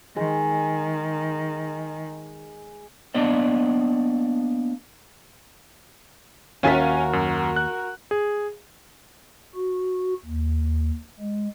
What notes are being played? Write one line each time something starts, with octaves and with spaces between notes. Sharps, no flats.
D#3 G#3
A#3 B3 D4 D5 D#5
D#2 C#4 F4 F#4 A#4 E5 F5 G#5
F#2
F#6
G#4
F#4
D#2
G#3